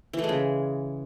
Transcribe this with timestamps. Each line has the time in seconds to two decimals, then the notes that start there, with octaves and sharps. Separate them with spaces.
0.13 E3
0.19 A3
0.24 G#3
0.29 C#3